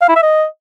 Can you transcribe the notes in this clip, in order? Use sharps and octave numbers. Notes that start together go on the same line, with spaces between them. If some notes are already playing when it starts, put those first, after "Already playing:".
F5
E4
E5
D#5